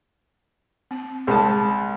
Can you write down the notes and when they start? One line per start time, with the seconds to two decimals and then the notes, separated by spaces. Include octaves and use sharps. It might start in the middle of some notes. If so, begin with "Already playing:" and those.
0.91 C4
1.27 C2 G#3 C#4 G#4 A5